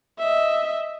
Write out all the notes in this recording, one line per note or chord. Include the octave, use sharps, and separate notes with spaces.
D#5 E5